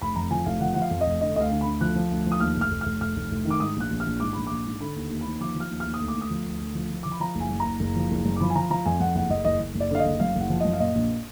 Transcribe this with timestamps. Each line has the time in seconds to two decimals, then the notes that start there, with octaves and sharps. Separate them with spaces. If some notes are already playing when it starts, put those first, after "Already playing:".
0.02 F1 B5
0.16 F2 A#5
0.31 F3 G#5
0.46 F1 F5
0.61 F3 F#5
0.74 F3 F#5
0.82 F5
0.91 F2
1.01 D#5
1.06 F1
1.21 D3 D#5
1.36 D2 D#5
1.41 F5
1.51 D3
1.61 B5
1.66 D2
1.81 F3 F#6
1.96 F3
2.11 D2
2.26 F3
2.32 D#6
2.40 D#2 F6
2.56 F1 F6
2.71 F1
2.81 F1 F6
3.01 F1 F6
3.16 F1
3.31 F1
3.45 D#3
3.50 D6
3.60 G#2 D#6
3.76 A#1 F#6
3.90 A#1
4.00 F6
4.06 A#1
4.20 G#2 D6
4.33 A#1 B5
4.47 A#1 D6
4.65 G#2
4.80 D3 B5
4.96 D#2
5.10 D#2
5.21 D#2 B5
5.40 F3 D6
5.56 F3 F6
5.70 D#2
5.80 F6
5.86 D#2
5.94 D#6
6.00 D2
6.08 D6
6.16 D2
6.21 D#6
6.31 F3
6.46 D2
6.61 D2
6.75 F3
6.90 F3
7.03 F3 D6
7.12 B5
7.20 F3 A#5
7.35 F#1
7.40 G#5
7.50 F#2
7.60 A#5
7.65 F#1
7.80 F#1
7.96 F3
8.11 F#1
8.25 F#2
8.36 D6
8.40 F3 B5
8.50 G#5
8.56 F3 A#5
8.70 F3 A#5
8.86 F2 G#5
9.00 F2 F#5
9.15 F#1 F#5
9.30 F#1 D#5
9.45 F#1 D#5
9.60 F#1
9.75 F#1
9.80 D5
9.91 D3 F5
10.00 D#5
10.05 F#1
10.20 F#2 F5
10.36 F#1 F#5
10.50 F3
10.60 F#2 D#5
10.73 F5
10.80 A#2 D#5
10.95 A#1